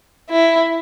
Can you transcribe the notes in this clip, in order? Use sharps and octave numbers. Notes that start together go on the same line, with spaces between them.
E4